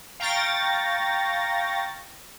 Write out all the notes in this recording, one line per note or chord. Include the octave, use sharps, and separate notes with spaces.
F5 G5 A#5 C#6 A6 A#6